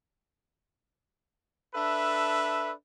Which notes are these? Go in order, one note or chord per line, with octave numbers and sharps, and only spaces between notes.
D4 A4 B4 E5